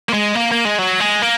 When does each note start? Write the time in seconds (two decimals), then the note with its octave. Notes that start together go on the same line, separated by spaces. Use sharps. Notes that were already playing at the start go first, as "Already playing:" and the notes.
0.09 A#3
0.13 G#3
0.35 A#3
0.52 A#3
0.65 G#3
0.79 F#3
1.00 G#3
1.22 A#3